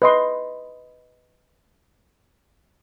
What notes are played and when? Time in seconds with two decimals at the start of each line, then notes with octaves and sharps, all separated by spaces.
0.02 B4 D#5 C6